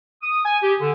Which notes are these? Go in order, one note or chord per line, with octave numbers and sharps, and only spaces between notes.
D#6
G#5
G4
D3